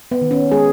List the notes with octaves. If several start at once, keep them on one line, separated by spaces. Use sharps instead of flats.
B3
D#3
C#4
G#3 G#4